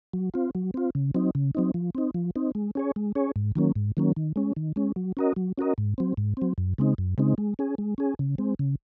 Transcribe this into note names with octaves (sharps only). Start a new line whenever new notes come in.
F#3
C4 F4
F#3
C4 F4
C#3
F#3 C4 D#4
C#3
F#3 C4 D#4
F3
C4 D#4
F3
C4 D#4
G#3
C#4 G#4 C#5
G#3
C#4 G#4 C#5
G#2
D#3 F#3 A#3 C#4
G#2
D#3 F#3 A#3 C#4
D#3
G#3 C#4
D#3
G#3 C#4
F#3
C#4 F#4 A#4 D#5
F#3
C#4 F#4 A#4 D#5
G#2
F#3 C4
G#2
F#3 C4
F#2
C#3 G#3 C4 D#4
F#2
C#3 G#3 C4 D#4
G#3
C#4 G#4
G#3
C#4 G#4
C#3
G#3 C4
C#3